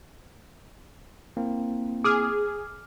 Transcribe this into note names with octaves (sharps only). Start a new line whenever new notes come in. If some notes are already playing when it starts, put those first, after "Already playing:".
A#3 C4 E4
G#4 D6 F6